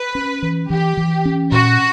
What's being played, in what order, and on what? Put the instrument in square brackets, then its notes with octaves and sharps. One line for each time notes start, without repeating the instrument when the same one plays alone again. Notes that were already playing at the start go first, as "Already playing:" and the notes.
Already playing: [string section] B4
[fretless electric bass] C#4
E3
[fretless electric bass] E3 [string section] G4
[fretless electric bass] E3
C#4
[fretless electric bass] A#2 [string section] F#4